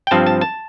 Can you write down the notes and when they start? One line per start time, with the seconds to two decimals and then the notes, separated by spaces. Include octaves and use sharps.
0.07 G5
0.11 G2 F3 C4 A5
0.26 A5
0.41 A5